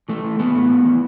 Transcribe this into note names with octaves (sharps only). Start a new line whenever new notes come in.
E3 A3
E3
E3 B3
A2
A2
E3